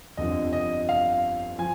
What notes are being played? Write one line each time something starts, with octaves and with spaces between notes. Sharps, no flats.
G1 F2 D3 F3 D#5
D#5
F5
F3 G#5